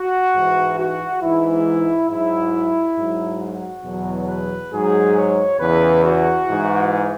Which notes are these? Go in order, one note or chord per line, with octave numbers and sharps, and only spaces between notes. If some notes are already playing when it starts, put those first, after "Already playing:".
Already playing: F#4
G#2 E3
F#4
G#2 E3 E4
G#2 F#3 E4
G#2 F#3
F#4
E2 B2 F#3
B4
G#2 F#3 G#4
C#5
E2 C#3 E3 B4
F#4
G#2 E3